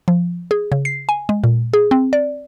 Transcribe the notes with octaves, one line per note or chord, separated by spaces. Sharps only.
F3
G#4
C#3
C7
G#5
G#3
A#2
G#4
C4
D5